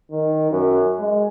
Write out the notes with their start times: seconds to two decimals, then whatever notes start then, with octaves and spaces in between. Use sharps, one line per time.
0.11 D#3
0.51 F#2
0.99 G#3